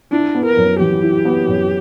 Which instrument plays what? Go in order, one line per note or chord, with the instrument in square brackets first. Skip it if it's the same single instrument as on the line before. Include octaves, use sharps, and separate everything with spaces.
[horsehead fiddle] D4 [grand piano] E4
[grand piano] B3
[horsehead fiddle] A#4
[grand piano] F#2
[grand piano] E3 [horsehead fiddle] G4
[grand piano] E4
B3
F#2